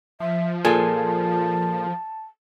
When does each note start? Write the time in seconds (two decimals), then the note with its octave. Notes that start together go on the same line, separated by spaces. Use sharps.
0.20 F3 E5
0.65 A#2 F4 G#4 A4 G#5 A5